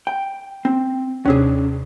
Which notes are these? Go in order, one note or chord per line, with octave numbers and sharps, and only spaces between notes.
G5
C4
D#2 C3 C#4 D4 G#4